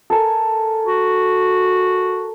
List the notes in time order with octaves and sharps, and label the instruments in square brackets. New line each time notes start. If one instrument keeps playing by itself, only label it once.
[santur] A4 A#4 G#5
[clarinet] F#4